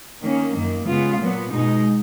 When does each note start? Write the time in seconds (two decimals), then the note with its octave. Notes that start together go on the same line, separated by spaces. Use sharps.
0.22 D#3 A#3 C#4
0.54 F#2 D#3 A#3
0.87 C#3 G#3 B3 F4
1.20 A#2 F#3 B3
1.52 B2 G#3 D#4